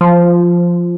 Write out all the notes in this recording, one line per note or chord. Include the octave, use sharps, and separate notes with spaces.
F3